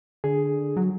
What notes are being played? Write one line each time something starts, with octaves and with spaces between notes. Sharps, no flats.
D3 G#4
F#3